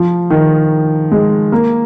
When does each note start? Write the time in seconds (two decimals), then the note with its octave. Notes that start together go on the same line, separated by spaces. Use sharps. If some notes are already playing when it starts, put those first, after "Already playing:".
Already playing: F3
0.30 D#3
1.11 G#3
1.52 A#3